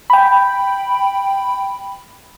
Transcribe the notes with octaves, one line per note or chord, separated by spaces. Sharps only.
G5 B5